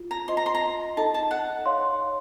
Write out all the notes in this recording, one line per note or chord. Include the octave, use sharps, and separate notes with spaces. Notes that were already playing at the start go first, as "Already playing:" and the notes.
Already playing: F4
A#5
F4 C5 D#5 C6
A#5
C6
A#5
D#4 A4 D#5 A5
A5
F#5
C#5 F5 C6